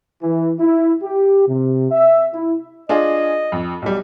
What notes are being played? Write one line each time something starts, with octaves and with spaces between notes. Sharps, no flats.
E3
E4
G4
C3
E5
E4
D4 F4 G#4 D#5
F2
B1 G3